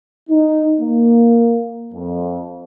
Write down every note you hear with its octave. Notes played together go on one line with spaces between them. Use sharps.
D#4
A#3
F2